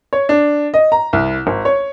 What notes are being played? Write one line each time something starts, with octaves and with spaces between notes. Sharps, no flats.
C#5
D4
D#5
A#5
C2
G#1
C#5